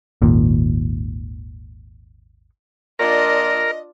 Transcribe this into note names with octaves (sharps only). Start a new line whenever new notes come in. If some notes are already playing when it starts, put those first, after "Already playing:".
G#1 D#2 A#2
A#2 D4 F4 A#4 D#5